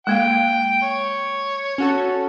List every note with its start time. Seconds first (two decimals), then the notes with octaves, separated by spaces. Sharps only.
0.07 G#3 A#3 F5 G5
0.82 C#5
1.78 C#4 F#4 A4